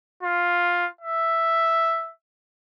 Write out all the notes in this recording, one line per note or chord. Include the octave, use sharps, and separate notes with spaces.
F4
E5